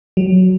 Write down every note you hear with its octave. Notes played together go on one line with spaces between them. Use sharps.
F#3